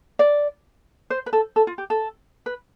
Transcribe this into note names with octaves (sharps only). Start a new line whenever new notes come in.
D5
C5
B4
A4
A4
F4
G4
A4
B4